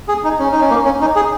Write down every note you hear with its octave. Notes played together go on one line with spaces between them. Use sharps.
G#4
D#4
C#4
D#4
C#4
A#3
C#4
D#4
G#4